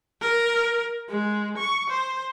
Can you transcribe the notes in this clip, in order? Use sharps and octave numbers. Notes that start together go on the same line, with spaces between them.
A#4
G#3
C#6
C5